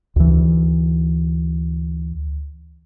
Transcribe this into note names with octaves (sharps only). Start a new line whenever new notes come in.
D2 E3